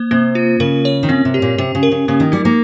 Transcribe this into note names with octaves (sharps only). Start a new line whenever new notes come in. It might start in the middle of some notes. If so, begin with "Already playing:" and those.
Already playing: A#3 C5
C3 A#3
F4
C#3 A#4
C#5
D#3
C#3 C4
C3
G4
A#2
C3 G4
C#3
A#4
C#3
C#3 A#3
D#3
G3 D#4
A#3